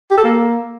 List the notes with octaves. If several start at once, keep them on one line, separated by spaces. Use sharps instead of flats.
G4
A4
A#3